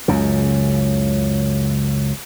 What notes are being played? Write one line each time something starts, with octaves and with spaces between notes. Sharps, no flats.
C#2 F#2 C#3